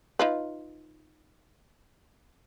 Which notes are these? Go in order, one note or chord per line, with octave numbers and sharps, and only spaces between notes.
D#4 F4 B4